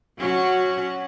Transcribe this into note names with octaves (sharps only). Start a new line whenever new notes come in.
F#3 C#4 F#4